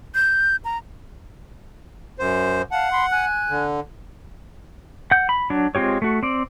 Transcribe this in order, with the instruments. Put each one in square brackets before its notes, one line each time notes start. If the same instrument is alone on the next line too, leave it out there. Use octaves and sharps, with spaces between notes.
[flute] G6
A#5
[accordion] F#2 C5
[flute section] F5 A5 [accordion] F#5
[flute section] B5 C6
G#5 F#6
[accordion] D3
[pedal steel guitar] F#5 G6
B5
F#3 D4
G#3 C4 F4 G4 C#5
A3 F#4
C4 D5